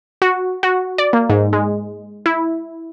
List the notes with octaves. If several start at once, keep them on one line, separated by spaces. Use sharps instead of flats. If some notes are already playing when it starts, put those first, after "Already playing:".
F#4
F#4
D5
A#3
G#2
G#3
E4